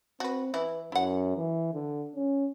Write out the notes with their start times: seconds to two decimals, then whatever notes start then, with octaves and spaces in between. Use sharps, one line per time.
0.20 C4 F#4 B4
0.54 E3 E4 B4
0.92 F#2 E4 F#5
1.36 E3
1.74 D3
2.15 C#4